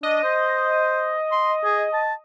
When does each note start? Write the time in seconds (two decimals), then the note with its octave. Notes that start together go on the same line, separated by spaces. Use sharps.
0.03 D4 D#5
0.24 C5
1.32 C6
1.64 G#4
1.93 A5